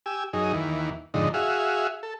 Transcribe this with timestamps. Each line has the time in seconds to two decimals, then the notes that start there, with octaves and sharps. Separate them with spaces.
0.06 G4 G#5 E6
0.33 F#2 D#4 G#4
0.53 D#2 E3
1.14 F2 G#2 D3 D#4
1.34 F#4 G#4 E5 F5
2.03 A4